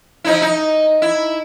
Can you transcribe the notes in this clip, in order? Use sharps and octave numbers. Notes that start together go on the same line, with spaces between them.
F3 D#4 E4
D#4
E4